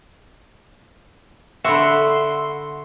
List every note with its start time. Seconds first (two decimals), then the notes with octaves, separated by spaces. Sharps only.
1.64 D3 F#4 E5 B5 C6